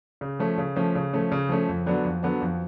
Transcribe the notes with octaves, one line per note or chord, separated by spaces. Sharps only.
C#3
F3 A3 C#4
C#3
F3 A3 C#4
C#3
F3 A3 C#4
C#3
F3 A3 C#4
F2
D3 F#3 B3 D4
F2
D3 F#3 B3 D4
F2